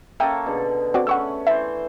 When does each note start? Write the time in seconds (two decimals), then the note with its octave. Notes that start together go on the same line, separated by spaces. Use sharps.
0.20 A#3 C#4 A4 E5 G5 D#6
0.46 B2 D3 G#4
0.94 C4 F#4 D5
1.07 A3 C#4 B4 F#5 C#6 E6
1.47 E3 C5 E5 A5